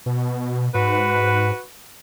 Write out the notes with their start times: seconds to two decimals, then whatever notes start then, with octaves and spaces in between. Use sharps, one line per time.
0.06 B2
0.75 G#2 F#4 B4